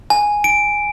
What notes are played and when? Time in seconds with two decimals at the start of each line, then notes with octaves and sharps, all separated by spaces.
0.10 G#5
0.44 D7